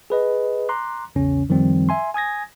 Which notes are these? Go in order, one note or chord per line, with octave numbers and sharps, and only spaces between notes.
G#4 B4 D#5
A#5 C6 D6 F#6
A#1 E2 C#3 C#4
F#2 D#3 F3 G3 C4
E5 G#5 C6
G#5 D#6 G#6 A#6